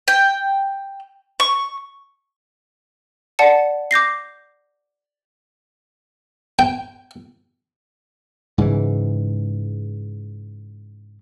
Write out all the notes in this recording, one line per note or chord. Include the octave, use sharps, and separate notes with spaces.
G5
C#6
D5 F#5 A5 C#7
D6 G6 A#6 C7
G5
G#2 C#3 E3